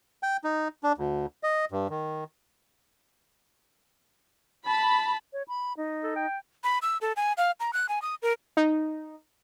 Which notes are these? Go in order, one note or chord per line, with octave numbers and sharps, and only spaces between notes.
G5
D#4
D4
D2
D#5
G2
D#3
A5 B5
C#5
B5
D#4
A4
G5
B5
E6
A4
G#5
F5
A#5
F#6
G#5
D#6
A#4
D#4